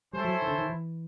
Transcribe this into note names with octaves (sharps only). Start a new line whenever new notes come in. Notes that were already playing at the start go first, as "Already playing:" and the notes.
G3 C#4 E4 A4 C5
F#3
D#3
D3
D#3
E3